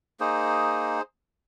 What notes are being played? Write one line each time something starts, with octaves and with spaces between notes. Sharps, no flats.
A#3 D#4 G#4 C5